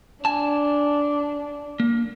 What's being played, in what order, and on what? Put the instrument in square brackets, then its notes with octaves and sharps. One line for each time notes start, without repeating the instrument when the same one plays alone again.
[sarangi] D4 [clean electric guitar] G#5 A5
[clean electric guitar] A#3